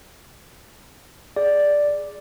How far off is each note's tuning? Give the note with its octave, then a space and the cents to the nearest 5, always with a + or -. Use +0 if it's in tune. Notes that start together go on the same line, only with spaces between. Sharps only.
G#4 +0 D5 +0